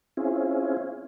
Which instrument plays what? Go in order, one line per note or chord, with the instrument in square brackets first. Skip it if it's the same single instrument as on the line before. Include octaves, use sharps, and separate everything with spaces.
[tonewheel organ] C4 C#4 E4 F4 G#4